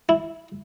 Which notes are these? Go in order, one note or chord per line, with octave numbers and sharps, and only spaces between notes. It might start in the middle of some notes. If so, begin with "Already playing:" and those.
E4